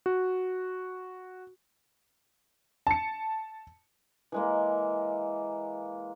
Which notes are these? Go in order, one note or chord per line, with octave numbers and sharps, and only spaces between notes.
F#4
A5 C#7
E3 G#3 A#3